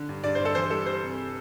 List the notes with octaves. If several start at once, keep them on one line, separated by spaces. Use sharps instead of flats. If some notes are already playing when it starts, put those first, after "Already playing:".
Already playing: D3
G2
G2 D5
G2 C5
A4
E3 C5
G3 A4
G3 C5
C3